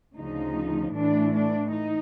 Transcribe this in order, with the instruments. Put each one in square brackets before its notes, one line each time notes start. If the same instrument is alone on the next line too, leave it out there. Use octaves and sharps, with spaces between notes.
[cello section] D2 C#3 F3 D#4
A2 E3 A3 D4
D4
D#4